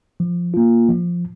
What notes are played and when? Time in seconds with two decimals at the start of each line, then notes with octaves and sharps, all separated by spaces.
0.20 F3
0.54 A#3 F4
0.89 F3